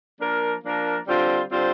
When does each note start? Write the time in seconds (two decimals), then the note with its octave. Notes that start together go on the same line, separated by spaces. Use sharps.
0.20 F3 A#3 D4 A#4
0.64 F3 A#3 D4 A#4
1.07 D3 G3 C4 F4 C5
1.50 D3 G3 C4 F4 C5